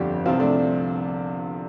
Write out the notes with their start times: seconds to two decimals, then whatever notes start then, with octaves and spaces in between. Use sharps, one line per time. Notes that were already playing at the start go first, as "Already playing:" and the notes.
Already playing: G1 F2 D3 F3 D4 G4
0.26 C2 C3 F3 C4 F4
0.40 A3 D4